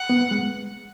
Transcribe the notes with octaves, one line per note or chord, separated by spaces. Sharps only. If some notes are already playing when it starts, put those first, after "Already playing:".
Already playing: F#5
B3
G#3